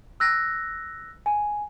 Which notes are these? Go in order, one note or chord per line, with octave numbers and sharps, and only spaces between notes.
E6 F#6 A#6
G#5